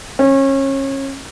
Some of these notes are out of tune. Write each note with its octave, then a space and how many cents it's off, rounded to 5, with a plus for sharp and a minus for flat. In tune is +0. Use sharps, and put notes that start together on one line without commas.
C#4 -30